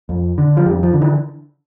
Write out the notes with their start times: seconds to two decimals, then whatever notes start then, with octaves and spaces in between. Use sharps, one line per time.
0.09 F2
0.38 D3
0.57 F3
0.65 F2 G3
0.83 F3
0.93 D3
1.02 E3